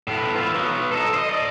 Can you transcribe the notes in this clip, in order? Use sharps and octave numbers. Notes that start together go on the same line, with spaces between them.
A2 B3
E3 F4
F#3 B3
D#4 A4
C5 D#5
D5 D#5